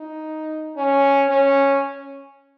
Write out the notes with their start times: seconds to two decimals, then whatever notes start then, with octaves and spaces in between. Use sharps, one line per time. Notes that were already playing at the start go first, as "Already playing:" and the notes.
Already playing: D#4
0.77 C#4
1.29 C#4